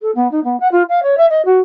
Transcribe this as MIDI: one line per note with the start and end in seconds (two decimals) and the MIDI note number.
0.01 0.11 69
0.15 0.29 59
0.31 0.43 63
0.44 0.58 59
0.60 0.68 78
0.72 0.83 65
0.89 1.00 77
1.02 1.15 73
1.17 1.26 76
1.30 1.41 75
1.45 1.60 66